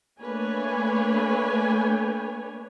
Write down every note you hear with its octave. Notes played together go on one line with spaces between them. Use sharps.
A3 A#3 D4 B4 C#5 G#5